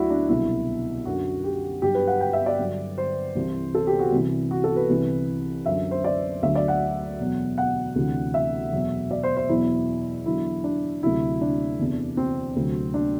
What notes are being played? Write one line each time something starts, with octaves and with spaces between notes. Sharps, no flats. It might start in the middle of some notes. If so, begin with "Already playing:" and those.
Already playing: D2 D3 F#3 D4 E4 F#4
D4
C2 B2 F#3 E4
F#2 D3 F#3 F#4
G4
G2 F#3 G4
B4
F#5
G5
E5
D5
G2 D3 F#3
C5
C2 C3 E3
A4
G4
F#4
C2 C3 E3
F#4
A4
B4
C2 C3 E3
F#2 D3 F#3 E5
C5
D5
D2 D3 F#3 E5
D5
F#5
E2 B2 F#3
F#5
D2 C3 E3
E5
E2 B2 F#3
D5
C5
C5
E2 B2 F#3 E4
E2 D3 F#3 E4
D4
D2 C3 F#3 E4
D4
E2 C3 E3
C4
D2 C3 F#3
D4